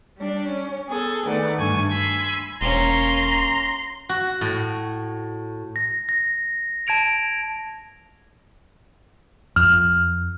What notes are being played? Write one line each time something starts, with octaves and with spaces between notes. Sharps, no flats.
G3 D4
C#4
B3 G#4 A4
D#3 A3 B3 D5
D2 G2 G#5 A5 C#6
G#5 B5 C6 E6 G#6
E1 A#3 C#4 A#5 C6
F#4
A2
A#6
A#6
A5 G#6 D7 F7
F2 F6